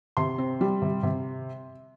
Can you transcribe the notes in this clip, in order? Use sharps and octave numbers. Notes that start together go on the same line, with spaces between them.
C3 C6
C4
G3
C3
C3